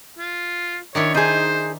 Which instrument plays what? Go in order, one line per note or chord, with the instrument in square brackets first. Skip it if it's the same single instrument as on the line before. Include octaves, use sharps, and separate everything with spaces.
[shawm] F4
[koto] D#3 D4 E4 [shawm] C#5
[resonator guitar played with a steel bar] D#4 G#4 [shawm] C5